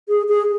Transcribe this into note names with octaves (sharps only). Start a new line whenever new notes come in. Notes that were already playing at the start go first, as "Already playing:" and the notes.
G#4
G#4